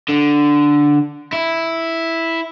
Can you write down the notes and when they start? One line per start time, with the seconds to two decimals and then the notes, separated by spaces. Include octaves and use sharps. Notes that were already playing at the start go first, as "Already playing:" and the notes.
0.09 D3
1.33 E4